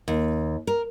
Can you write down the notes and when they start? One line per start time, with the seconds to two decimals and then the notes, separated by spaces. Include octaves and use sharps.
0.08 D#2
0.67 A#4